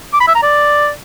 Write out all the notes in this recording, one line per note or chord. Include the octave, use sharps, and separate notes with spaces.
D6
B5
E5
A#5
D5